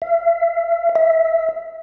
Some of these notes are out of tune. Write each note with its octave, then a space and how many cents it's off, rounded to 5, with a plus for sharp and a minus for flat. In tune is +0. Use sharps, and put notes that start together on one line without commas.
E5 +40
E5 +0